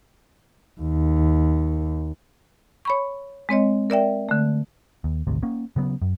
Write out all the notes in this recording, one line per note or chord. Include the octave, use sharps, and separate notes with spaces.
D#2
C#5 B5 C#6
G#3 C4 C#5 D#5
A#4 D5 E5 G5
D3 A3
D#2
G#1 D2 C3
A#3 C#4
C#3 F#3 B3
F#2